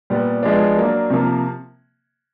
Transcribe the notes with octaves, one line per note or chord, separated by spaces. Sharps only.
A#2 G3 B3
F3 G#3 B3 D4
F#3 A#3 D4
C3 F3 A#3